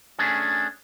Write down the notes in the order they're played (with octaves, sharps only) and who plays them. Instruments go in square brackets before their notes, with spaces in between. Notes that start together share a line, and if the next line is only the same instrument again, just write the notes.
[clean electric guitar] A3 C#4 D4 G#4